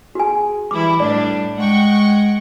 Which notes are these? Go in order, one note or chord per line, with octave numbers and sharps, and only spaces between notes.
F#4 G#4 G#5
E3 G3 E4 D6
A2 G3 D4 D5
G#3 F#5 G5 C#6